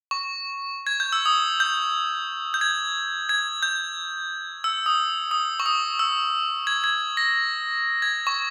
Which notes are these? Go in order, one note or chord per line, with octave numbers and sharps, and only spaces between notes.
C#6
G#6
G6
E6
D#6
G6
G6
G#6
G#6
G6
E6
D#6
D#6
C#6
D#6
E6
G#6
G#6
A#6
G#6
C#6